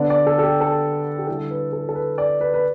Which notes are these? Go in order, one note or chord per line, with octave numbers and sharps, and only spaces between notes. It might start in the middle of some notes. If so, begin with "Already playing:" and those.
Already playing: D3 B3 D4 D5
D5
A4
A4
G4
A4
G4
D3 G3 E4 A4
B4
A4
A4
B4
D5
B4
B4